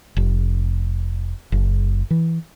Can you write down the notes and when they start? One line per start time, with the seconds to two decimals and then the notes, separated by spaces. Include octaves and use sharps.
0.17 F1
1.52 F#1
2.10 E3